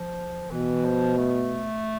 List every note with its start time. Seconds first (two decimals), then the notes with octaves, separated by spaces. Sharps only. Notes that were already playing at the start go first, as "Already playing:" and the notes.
Already playing: F3
0.51 B2 E3
0.85 F3
1.18 A3